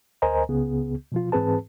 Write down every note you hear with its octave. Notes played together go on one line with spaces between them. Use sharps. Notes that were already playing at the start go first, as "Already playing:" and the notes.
D2 A#4 C5 D#5 G#5 A#5
C#2 C#3 B3 G#4
B2 F3 F4
G#2 E3 C4 G#4 B4 A5